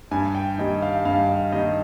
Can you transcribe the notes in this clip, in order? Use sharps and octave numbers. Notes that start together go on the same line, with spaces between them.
G2 G#5
G5
D#3 G3 D#5
F5
G2 F5
D#5
D#3 G3 D#5